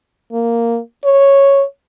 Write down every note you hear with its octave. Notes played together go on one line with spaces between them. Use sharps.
A#3
C#5